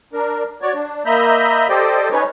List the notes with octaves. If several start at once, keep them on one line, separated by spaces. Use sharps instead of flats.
D4 A#4
F#4 C#5 D5
D4
A#3 D#5 E5 A#5 B5 G6
G4 A4 C5 D5 D#5 G5
C#4 D#4 B4 C#5